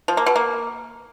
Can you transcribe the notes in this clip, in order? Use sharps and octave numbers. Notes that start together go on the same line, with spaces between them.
F3
A#3
B2
A#3